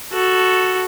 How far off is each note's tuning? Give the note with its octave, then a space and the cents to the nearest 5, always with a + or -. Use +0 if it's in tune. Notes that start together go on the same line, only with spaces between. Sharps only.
F#4 +0 A4 +0